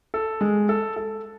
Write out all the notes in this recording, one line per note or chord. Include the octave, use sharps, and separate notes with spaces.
A4
G#3
A4
A4